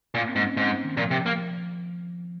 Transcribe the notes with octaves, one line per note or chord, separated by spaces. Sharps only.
A#2 A#3
C4
G#2
C#4
G#2 C4
D#3
A#2 F3
C3
A#3